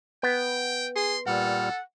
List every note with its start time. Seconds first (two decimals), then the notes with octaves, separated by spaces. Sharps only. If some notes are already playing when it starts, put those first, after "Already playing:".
0.23 B3 G5
0.96 G#4 C6
1.27 A#2 G3 A4 F#5 F6